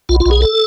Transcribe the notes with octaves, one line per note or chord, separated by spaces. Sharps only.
B1 F4
F4
B1
G#4
A4